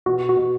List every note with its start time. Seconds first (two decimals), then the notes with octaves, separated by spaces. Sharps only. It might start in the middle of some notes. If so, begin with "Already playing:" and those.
0.06 B2 F#4
0.29 F#4
0.37 B2